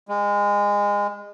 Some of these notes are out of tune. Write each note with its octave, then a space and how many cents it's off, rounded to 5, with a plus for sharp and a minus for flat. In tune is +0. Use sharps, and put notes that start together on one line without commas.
G#3 -25